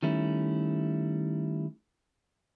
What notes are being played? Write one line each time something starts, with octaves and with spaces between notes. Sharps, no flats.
D#3 G3 A3 C#4 E4